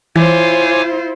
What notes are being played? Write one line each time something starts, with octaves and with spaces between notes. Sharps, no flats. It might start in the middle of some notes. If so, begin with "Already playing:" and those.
E3 E4 F4 C5 C#5 G#5 D6